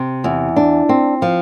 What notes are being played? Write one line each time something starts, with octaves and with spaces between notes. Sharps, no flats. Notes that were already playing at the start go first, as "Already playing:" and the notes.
Already playing: C3
E2
D4
C4
F3